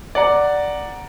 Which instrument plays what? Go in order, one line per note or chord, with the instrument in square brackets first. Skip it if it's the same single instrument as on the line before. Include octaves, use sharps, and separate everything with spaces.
[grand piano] D5 F#5 A#5